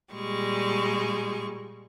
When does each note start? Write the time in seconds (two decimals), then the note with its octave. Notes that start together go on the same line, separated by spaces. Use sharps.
0.13 A#2 G3 G#3 C#6